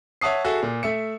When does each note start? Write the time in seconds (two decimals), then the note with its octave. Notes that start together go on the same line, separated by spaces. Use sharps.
0.21 C#5 E5 F#5 A5 D#6 C7
0.45 F#4 G#4 A4 E5
0.63 A#2
0.83 A3 E5 C#7